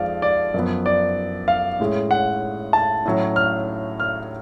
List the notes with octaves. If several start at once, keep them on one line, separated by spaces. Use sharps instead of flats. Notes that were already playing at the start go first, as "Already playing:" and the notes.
Already playing: F2 F3 G#3 D5 F5
D5
F#2 F3 B3
D5
F5
A2 G#3 C#4
F#5
A5
A2 F#3 C#4
F6
F6